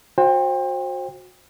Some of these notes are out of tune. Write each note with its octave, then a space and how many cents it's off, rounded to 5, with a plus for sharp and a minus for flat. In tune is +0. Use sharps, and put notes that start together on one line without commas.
F#4 -25 C5 +25 G5 +30